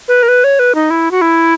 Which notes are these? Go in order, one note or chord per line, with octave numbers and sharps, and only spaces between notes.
B4
A#4
B4
C#5
B4
D#4
E4
F#4
E4